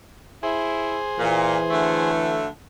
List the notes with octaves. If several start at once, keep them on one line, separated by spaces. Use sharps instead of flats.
E4 G#4 C5
A#2 E3
D3 F#3 A3